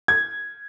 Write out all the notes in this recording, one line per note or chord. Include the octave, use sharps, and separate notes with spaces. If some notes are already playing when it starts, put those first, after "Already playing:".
G#6